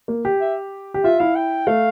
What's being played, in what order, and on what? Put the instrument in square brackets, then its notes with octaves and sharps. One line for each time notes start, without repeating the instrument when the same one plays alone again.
[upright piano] A#3
G4
[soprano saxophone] E5
[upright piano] G4
[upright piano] F4 [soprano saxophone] E5
[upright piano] E4 [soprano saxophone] F5
[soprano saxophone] G5
[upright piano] A3 [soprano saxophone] F5